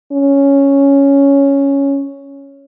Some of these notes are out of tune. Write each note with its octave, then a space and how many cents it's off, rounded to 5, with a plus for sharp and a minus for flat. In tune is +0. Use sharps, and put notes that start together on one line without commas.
C#4 +0